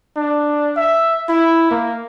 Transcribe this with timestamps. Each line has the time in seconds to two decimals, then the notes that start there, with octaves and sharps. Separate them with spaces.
0.16 D4
0.76 E5
1.29 E4
1.71 A#3